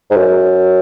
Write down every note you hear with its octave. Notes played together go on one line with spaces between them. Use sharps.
G#2
F#2